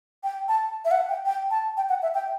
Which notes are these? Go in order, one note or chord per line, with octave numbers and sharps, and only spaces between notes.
G5
A5
E5
F#5
G5
G5
A5
G5
F#5
E5
G5